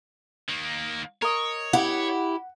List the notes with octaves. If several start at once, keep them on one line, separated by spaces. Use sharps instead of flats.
D#3 A#3
A#4 C#5 D#5
E4 G4 F#5